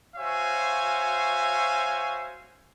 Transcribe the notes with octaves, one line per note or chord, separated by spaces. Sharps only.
F#4 C5 C#5 E5 F5 G#5